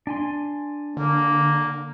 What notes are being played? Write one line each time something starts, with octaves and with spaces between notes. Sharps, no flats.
D4 G#5 C6
D3 A#3